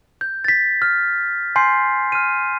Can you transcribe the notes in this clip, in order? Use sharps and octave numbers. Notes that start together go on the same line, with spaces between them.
G6
A6 B6
F6
G#5 C6 G6 C7
F6 D#7